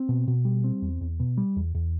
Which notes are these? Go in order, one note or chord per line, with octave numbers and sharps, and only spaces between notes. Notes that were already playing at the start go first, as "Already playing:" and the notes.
Already playing: C4
B2
B2
G3
C4
E2
E2
B2
G3
E2
E2